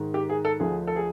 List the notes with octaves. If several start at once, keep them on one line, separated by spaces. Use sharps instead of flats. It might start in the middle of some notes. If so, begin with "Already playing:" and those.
Already playing: G#2 D#3
G4
G#4
A4
D2 D3 F3 G#4
A4
G#4